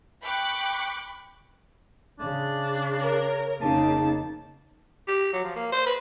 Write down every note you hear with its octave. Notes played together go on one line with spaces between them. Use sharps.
G5 B5 C#6 D6 F#6
C#3 D4
A#4 C#5
F1 C#3 A#3 D#4 A5
G4
F#3
F3
A#3
C5
B4